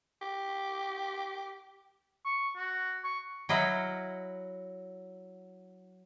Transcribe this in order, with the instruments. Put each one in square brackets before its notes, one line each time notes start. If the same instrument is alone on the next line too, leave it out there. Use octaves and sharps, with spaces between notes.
[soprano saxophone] G4
[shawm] C#6
F#4
C#6
[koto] F#3 E4 D#5 F5 F#5